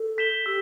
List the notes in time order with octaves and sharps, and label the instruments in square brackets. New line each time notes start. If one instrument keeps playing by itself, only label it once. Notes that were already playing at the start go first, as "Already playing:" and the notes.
Already playing: [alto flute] A4
[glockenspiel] G6 B6 E7 G7
[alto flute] G4 [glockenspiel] E6